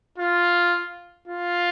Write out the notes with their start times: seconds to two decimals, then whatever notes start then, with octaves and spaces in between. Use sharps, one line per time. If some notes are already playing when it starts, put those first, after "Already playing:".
0.18 F4
1.27 F4